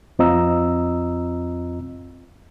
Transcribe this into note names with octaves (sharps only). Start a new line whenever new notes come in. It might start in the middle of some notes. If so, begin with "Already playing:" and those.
F2 C4 F4 D#5 A#5 E6